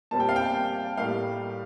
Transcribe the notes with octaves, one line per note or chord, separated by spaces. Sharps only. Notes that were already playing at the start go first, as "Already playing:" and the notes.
A#2 G3 C4 A5
G5
F5
G5
A2 G3 A#3 F5